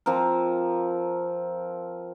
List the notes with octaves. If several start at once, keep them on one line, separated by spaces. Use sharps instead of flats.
F3 C4 A#4